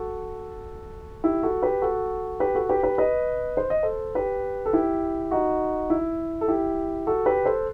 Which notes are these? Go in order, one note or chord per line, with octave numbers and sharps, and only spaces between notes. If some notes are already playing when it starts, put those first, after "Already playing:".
Already playing: F#4 A4
E4 G4
F#4 A4
G4 B4
F#4 A4
G4 B4
F#4 A4
G4 B4
G4 B4
B4 D#5
C5
D#5
A4 C5
G4 B4
A4
E4 G4
D#4 F#4
E4
A4
E4 G4
F#4 A4
G4 B4
A4 C5